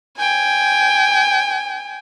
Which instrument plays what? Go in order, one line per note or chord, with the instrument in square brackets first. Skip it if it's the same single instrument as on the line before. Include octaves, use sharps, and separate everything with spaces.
[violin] G5 G#5